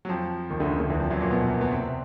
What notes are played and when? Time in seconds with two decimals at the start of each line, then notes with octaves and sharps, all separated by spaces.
0.05 F#3
0.09 F2 F3
0.50 D#2 D#3
0.60 D2 D3
0.70 C#3
0.80 D2 D3
0.90 E2 E3
1.00 F2 F3
1.10 F#2 F#3
1.21 A#2 A#3
1.31 B2 B3
1.61 B3
1.71 C3 C4